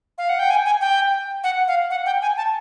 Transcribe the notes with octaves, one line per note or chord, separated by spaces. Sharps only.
F5
F#5
G5
G#5
G#5
G5
F#5
F5
F#5
G5
G#5
A5